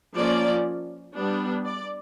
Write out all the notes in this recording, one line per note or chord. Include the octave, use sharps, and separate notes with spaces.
F3 A#3 C#4 D5
G3 B3 D4
D5